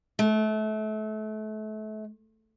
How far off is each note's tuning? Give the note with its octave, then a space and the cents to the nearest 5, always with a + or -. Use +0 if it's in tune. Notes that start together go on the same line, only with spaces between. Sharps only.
A3 -30